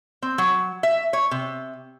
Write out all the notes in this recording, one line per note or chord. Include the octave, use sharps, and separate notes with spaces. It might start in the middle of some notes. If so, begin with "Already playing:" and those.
C4
F#3
E5
C#5
C3